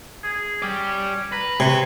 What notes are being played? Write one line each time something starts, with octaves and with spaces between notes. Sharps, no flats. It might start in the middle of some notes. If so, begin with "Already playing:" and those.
G#4
C#4 G4 D5
B4 A#5
C3 C#5